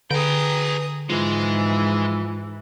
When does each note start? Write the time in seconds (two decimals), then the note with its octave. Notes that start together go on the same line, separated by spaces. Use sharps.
0.11 D3 G#4 B4 G5 A#5 D#6
1.09 G#2 E3 F3 G#3